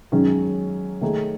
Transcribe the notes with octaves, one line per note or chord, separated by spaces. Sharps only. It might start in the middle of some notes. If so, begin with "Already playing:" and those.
F#2 D#3 G#3 C#4
D#3 A3 D#4 G#4